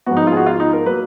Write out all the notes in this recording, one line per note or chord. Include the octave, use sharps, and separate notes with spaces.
G#2 F3 B3 F#4
D#4
F4
G#4
F#4
F4
D#4
A#4
F#3 A#3 B4